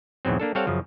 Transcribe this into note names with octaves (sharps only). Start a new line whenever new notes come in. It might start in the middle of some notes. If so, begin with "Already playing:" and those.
E2 G#2 B2 F#3 C4
A#3 D4 A4
G3 C4 A4 C#5 F5 F#5
F#2 C#3 F3